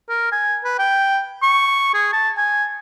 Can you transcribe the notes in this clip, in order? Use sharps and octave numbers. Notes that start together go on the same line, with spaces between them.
A#4
G#5
B4
G5
C#6
G#4
A5
G#5